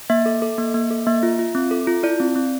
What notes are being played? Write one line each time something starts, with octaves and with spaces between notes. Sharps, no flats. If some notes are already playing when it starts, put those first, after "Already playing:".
A#3 E5
A4
A4
A#3
A#3
A4
A#3 E5
F4
F4
C4
A4
F4
E4 D5
C4
C4